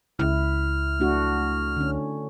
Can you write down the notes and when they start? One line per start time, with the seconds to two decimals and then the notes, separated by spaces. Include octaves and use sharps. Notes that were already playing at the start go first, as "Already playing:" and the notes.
0.19 C#2 E4 F6
1.00 A3 D4 F#4
1.77 D3 C#4